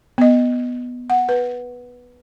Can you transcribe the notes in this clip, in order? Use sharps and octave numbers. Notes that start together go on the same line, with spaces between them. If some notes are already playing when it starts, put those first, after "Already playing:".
B3 D#5
F#5
B4